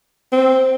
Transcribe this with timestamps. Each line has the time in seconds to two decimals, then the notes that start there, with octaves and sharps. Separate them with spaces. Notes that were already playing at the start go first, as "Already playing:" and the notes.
0.32 C4